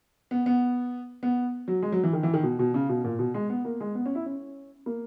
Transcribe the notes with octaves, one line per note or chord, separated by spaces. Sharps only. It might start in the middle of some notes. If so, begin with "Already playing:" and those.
B3
B3
B3
F#3
G#3
F#3
E3
D#3
E3
D#3
B2
B2
C#3
B2
A#2
B2
G#3
B3
A#3
G#3
B3
C#4
E4
C#4
A#3